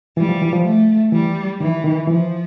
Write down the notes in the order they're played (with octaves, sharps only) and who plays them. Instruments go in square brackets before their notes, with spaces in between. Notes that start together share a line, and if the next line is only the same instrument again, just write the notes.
[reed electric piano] E3 [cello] G3
[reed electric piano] F3
E3
F3
[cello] A3
[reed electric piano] E3 [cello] G3
[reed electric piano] D#3 [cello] E3
[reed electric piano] D#3
[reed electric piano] E3 [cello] F3